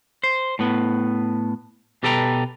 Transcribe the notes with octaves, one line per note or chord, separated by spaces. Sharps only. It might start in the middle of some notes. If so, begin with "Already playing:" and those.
C5
A2 B3
B2 G4 A4 B4 G5 A#5